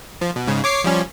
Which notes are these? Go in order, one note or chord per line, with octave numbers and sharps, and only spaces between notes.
F3
B2
G#2 C#3
C#5 D6 C7
F3 G3 C#4